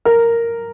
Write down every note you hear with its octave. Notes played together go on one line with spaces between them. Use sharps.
A#4